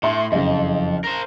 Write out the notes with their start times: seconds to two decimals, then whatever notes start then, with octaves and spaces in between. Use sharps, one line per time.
0.03 A2 E5 C6
0.32 F#1 F2 D#5
1.04 A#4 C5